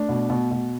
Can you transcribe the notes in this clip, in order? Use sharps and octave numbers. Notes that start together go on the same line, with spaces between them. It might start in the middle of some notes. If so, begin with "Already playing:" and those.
Already playing: A3 D4
B2
B2
B2